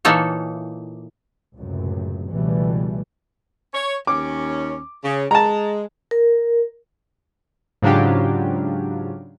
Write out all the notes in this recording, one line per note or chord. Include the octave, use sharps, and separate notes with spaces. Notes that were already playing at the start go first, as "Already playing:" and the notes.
A#2 E3 A#3 D#4 A4 C#5
C#2 F#2 A2 C3
C#2 B2 E3 G3 A3
C#5
D#2 C#4 D6
C#3
G#3 A5 A#5
A#4
G#2 C#3 F#3 D4 F4 G4